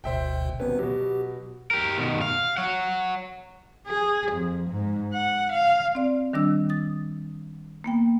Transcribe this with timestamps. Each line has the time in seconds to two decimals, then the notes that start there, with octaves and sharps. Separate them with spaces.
0.04 G1 D2 B2 C5 E5 G5
0.60 G#1 C3 B3 C#4 B4
0.79 B2 F#3 G4
1.71 G4 A#4
1.98 B2 D#3
2.21 F5
2.57 C#5 F#5
3.88 G#4
4.33 F2
4.71 G#2
5.13 F#5
5.53 F5
5.95 C4 D5
6.33 D#3 G3 D4 E6
6.69 D#6 A6
7.84 A#3 B3 G5